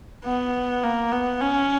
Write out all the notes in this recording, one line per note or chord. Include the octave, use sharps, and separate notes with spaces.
B3
A#3
B3
C#4